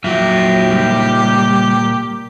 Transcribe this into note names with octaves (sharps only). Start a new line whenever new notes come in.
F2 A#2 F#3 G4 E5
C#2 G3